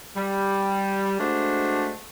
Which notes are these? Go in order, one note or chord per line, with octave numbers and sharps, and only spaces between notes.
G3
G#3 A3 D4 F#4 C5